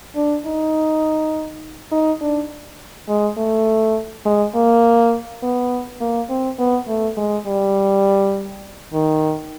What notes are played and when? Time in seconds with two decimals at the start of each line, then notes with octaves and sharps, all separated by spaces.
0.16 D4
0.46 D#4
1.92 D#4
2.21 D4
3.09 G#3
3.37 A3
4.26 G#3
4.55 A#3
5.43 B3
6.01 A#3
6.30 C4
6.59 B3
6.88 A3
7.17 G#3
7.47 G3
8.93 D#3